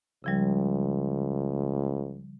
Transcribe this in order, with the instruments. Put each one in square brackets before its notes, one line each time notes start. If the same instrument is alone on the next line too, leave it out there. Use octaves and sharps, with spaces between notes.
[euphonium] C#2 [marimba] C#3 F3 G3